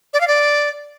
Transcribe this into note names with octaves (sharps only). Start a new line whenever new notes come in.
D5
F5
D5